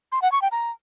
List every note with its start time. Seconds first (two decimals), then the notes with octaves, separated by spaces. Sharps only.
0.12 C6
0.22 F#5
0.32 C#6
0.42 G5
0.52 A#5